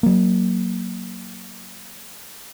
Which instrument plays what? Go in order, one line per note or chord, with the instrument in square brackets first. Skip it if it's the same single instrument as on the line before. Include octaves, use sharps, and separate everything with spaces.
[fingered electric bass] F#3 A#3